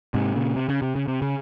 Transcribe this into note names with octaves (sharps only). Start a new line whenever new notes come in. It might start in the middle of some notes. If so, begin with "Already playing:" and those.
G#2 C3
A#2 C#3
C3
C#3
C3
C#3
C3
C#3